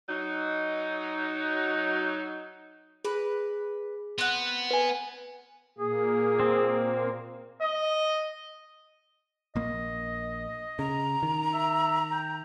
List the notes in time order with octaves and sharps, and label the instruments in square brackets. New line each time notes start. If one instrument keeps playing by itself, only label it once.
[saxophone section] F#3 D#4
[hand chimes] G#4 [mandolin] B4
[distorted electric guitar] B3 [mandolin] C4 F#5
[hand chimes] B4 G#5
[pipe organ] A#2 A#3 [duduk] G#4
[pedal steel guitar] C4
[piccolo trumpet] D#5
[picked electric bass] A#1 A#3 [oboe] D#5
[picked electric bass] C#3 [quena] A#5
[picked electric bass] D#3
[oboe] E5
G5